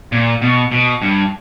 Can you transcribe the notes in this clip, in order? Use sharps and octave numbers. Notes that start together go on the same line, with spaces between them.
A#2
B2
B2
G2